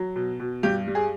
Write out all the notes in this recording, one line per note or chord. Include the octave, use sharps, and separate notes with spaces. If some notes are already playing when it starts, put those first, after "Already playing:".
Already playing: F#3
B2
B2
G2 G4
G3
G#4